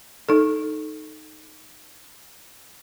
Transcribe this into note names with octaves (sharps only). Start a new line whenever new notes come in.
D#4 A4